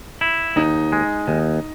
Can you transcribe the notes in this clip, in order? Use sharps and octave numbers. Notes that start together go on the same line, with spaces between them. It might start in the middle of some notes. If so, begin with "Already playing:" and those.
E4
D#2 D#4
G#3
D#2